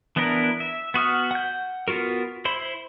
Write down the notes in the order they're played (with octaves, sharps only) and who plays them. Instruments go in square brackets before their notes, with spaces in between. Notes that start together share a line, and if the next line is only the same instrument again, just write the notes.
[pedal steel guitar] E3 B3 D4 E4 A#4
E5
B3 F#4 D#6 F6
F#5 G6
B3 F4 F#4 A#4
E4 C5 B5